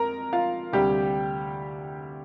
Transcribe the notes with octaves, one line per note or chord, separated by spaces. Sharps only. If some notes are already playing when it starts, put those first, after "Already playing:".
Already playing: F2 A#4 A#5
F4 F5
D2 C3 G3 G4